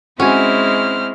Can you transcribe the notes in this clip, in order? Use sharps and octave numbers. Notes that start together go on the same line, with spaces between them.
G#3 C4 C#4 E4 F#4 C5 G#5 F6